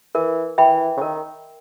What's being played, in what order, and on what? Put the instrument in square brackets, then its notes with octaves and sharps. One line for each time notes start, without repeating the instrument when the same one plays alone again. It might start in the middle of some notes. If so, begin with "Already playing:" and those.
[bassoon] E3 [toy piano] A#4
[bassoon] E3 [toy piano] E5 G5 B5
[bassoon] C#3
[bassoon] D#3 [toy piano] A#4